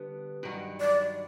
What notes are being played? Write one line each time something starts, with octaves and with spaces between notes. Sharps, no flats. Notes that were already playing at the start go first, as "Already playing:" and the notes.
Already playing: D3 G3 B3
G2 D#3 F#3
D5